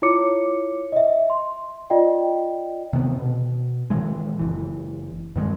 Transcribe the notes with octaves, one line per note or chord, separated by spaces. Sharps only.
E4 F4 C#5 D6 C#7
D#5 E5
C6
F4 D5 D#5 G5
C3 D#3 B3
B2
A#2 D#3 E3 G#3
F#1 B1 E3
G2 D#3 G3 G#3